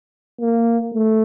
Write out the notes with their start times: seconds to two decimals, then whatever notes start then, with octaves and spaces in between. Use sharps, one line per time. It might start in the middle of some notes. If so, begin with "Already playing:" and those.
0.40 A#3
0.94 A3